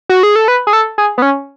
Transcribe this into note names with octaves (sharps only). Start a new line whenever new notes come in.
F#4
G#4
A4
B4
G#4
A4
G#4
B3
C#4